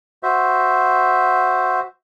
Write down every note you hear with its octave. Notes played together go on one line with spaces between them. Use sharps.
F#4 C5 E5